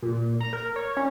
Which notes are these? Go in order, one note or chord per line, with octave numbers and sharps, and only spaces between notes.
A#2
A#5
A#4
C#5
C#4